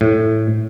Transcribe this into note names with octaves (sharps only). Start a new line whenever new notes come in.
A2